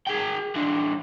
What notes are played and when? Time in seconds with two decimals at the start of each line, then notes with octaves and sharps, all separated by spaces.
0.07 G#4 G5
0.56 E3 D4